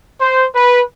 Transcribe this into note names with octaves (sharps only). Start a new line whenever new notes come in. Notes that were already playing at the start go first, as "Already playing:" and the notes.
C5
B4